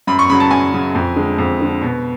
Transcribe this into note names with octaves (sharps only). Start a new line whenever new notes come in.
F#2 B5
C#6
C#3 F#3 B5
A5
F#2 G#5
C#3 F#3
F2
D3 G#3
F2
D3 G#3
B2